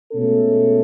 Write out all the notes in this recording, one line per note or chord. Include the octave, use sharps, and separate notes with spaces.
B2 G#3 A3 C#4 A4